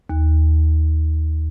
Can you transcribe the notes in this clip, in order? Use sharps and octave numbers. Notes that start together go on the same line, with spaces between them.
D#2